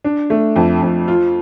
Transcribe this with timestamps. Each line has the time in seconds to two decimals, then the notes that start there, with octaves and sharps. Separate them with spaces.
0.05 D4
0.30 A3
0.56 F2
0.82 F2
1.08 F4